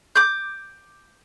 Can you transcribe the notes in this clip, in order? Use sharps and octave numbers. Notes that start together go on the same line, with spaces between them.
D6 G6